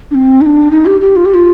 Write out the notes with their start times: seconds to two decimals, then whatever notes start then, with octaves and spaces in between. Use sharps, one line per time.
0.11 D4
0.15 C4
0.41 D#4
0.46 D4
0.71 D#4
0.86 G4
1.01 G4
1.16 F4
1.25 G4
1.34 F4